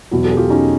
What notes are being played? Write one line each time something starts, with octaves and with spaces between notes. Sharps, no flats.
E2 B2 F#3
G4 A4
G#4
F4 G4
C#4 D#4